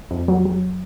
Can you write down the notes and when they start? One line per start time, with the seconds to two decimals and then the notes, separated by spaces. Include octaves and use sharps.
0.11 F2
0.28 F#3
0.45 F#3